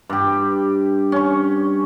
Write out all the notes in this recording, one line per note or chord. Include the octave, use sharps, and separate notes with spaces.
G2 G4
C#4 C#6